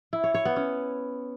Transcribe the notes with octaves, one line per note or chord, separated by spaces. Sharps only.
E4
C#5
C#5
B3
C#4